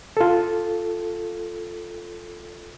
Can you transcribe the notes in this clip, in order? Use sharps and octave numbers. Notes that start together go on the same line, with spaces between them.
F4 A4